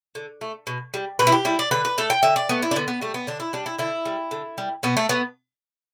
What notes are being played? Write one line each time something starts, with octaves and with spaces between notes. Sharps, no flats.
D3
A3
B2
G3
B2 B4
E4
G4
G3 E4
D5
D3 B4
B4
A3 A4
G5
D3 E5
D5
A3 B3
E4
D4
D3 B3
B3
G3 A3
B3
D3 D4
E4
G3 D4
E4
D3 E4
G3
D3
G3
B2 B3
A3
A3 B3